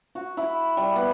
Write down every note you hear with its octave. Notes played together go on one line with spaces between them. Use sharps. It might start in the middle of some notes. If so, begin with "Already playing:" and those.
F#4
E4
G3
B3